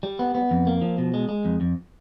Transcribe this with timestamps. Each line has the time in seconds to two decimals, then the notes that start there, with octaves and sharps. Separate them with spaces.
0.03 G3
0.19 B3
0.35 B3
0.51 F2
0.67 A#3
0.82 F3
0.98 B2
1.14 G#3
1.29 G#3
1.45 F2
1.61 F2